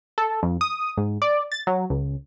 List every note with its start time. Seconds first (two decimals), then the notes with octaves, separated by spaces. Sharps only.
0.18 A4
0.43 F2
0.61 D#6
0.98 G#2
1.22 D5
1.52 A6
1.67 F#3
1.90 C#2